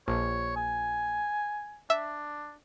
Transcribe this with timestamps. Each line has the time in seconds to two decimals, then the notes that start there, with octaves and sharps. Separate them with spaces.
0.08 A#1 C#5
0.56 G#5
1.90 D4 E5